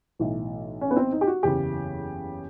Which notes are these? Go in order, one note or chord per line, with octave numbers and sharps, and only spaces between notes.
B1 A2 E3
C#4
B3
C4
D#4
G4
F#4
F#1 E2 C#3 G4